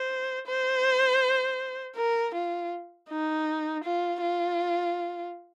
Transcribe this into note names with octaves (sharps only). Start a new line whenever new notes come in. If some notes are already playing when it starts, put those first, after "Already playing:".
Already playing: C5
C5
A#4
F4
D#4
F4
F4